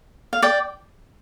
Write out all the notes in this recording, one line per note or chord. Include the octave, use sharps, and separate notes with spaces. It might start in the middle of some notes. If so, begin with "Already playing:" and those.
F5
D5 G5